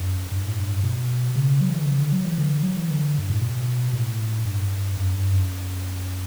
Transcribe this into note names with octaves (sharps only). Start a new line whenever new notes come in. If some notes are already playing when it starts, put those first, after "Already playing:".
Already playing: F#2
G2
A2
G2
B2
C#3
F#3
E3
D3
C#3
D3
F#3
E3
D3
F#3
E3
D3
G2
A2
B2
A2
G2
F#2
G2
F#2